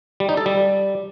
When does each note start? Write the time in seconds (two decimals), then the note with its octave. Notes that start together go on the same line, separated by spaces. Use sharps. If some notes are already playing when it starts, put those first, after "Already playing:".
0.20 G3
0.29 D#4
0.37 A4
0.46 G3